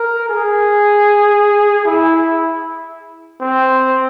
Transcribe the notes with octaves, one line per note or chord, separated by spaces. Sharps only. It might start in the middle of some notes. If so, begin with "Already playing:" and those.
Already playing: A#4
G#4
E4
C4